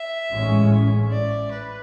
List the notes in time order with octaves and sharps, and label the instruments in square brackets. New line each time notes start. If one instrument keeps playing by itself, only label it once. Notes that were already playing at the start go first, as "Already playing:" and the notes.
Already playing: [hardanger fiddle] E5
[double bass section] A1 G#2 G#3 C#4
[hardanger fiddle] D5
B4